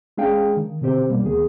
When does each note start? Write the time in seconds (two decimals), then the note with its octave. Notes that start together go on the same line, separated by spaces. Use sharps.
0.18 G#3 C#4 D4 G#4 F5 G5
0.57 D#3
0.81 B2 D3 C4 G4 C5
1.09 B2 G3 A#3
1.23 D2 D#3 B3 G#4